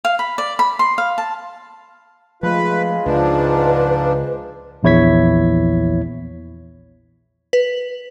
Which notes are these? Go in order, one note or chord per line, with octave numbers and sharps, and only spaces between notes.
F5
B5
D5
B5
C6
F5
A5
F3 G#3 A3 F4 B4
C#2 G#2 F3 D4 B4
A#1 E2 E4 C#5 G#6 B6
B4